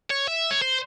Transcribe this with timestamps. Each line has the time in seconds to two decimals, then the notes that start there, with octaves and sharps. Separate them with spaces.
0.10 C#5
0.27 E5
0.51 C#5
0.62 C5